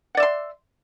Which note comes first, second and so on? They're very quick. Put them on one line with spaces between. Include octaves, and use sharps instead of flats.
F#5 D5 E5 C6